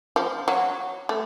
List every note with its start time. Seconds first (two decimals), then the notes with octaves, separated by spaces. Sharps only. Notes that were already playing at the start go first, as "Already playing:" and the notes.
0.16 F3
0.48 F#3
1.09 A3